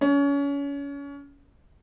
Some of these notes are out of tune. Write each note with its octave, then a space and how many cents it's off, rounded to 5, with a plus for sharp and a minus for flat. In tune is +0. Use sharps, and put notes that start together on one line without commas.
C#4 +30